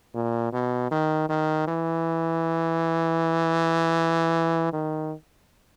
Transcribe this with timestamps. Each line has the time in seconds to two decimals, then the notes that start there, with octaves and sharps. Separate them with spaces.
0.15 A#2
0.53 B2
0.91 D#3
1.29 D#3
1.68 E3
4.73 D#3